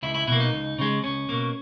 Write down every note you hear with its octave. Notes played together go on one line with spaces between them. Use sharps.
C#2 E4
E4
B2 E4
A#3
D#4
C#2
C#3 G#3
C#2 C#4
B2 A#3